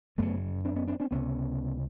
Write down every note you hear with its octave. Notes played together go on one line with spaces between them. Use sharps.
G1 F#2 C#3 A3 B3
C4 D4
B3 C#4
C4 D4
C4 D4
C#2 C3 B3 C#4